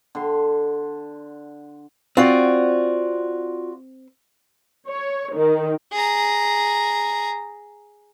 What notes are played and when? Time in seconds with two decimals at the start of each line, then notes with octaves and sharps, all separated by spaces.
0.15 D3 C6
2.17 C4 F4 F#4 D5
4.88 C#5
5.35 D#3
5.92 G#4 A#5